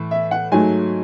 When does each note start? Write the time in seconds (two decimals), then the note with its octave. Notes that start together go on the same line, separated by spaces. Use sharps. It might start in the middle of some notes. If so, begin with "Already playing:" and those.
Already playing: A2 E3
0.11 E5
0.31 F#5
0.51 G#2 F#3 A3 G#5